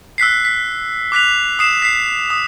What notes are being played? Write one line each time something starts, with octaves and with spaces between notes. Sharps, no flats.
E6 F#6 B6 C7
B6
D6 F#6 B6 F7
D#6 C7 E7
B6 C7
D#6